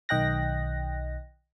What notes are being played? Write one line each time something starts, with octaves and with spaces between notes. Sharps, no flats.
B1 D#3 D#5 G5 F#6 A#6